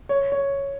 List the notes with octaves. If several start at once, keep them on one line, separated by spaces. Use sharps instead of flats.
C#5
C#5